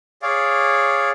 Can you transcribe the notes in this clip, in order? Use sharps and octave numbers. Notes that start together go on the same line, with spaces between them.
G#4 C#5 D5 F5